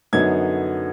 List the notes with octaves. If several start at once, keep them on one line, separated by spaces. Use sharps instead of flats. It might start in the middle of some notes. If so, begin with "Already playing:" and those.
F#2 D3 F#3 B3 D#4 G#6